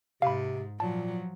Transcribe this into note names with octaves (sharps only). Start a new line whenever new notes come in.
G#2 C3 F5 B5
A#2 F3 F#3 A5